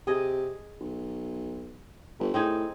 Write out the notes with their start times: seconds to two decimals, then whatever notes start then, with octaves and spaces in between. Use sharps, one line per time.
0.07 C3 G#4 D#5
0.80 B1
2.19 G1
2.34 A2 C4 D#4 G#4